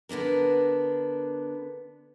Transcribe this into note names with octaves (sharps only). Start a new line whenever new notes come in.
D3 B3 D4 A#4